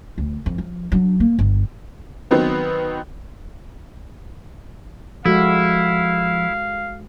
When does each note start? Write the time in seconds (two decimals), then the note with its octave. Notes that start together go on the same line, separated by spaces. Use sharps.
0.18 D2
0.46 F2
0.58 F3
0.92 F#3 D4
1.20 A#3
1.39 G1
2.31 D#3 F#3 B3 C4
5.26 F3 G#3 E4 F#4 A4 F5